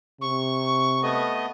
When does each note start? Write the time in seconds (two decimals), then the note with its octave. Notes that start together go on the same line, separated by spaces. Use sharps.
0.21 C3 C#6
1.03 A3 B3 D#5